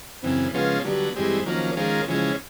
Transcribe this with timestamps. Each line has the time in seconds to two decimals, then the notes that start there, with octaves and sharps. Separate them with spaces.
0.23 F#2 C#3 E3 C4
0.53 C#3 F3 G#3 B3 C#4 F4
0.85 D3 F#3 G3 B3
1.16 G2 E3 G3 G#3 C4
1.46 D#3 F3 F#3 A#3 C#4
1.77 D#3 G#3 C#4 F4 A#4
2.08 C#3 E3 F3 G#3 C#4